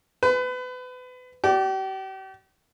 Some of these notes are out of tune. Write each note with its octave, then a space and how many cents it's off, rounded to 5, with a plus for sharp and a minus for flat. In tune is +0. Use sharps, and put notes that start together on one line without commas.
B4 +30 B5 +45
G4 -40 D5 +0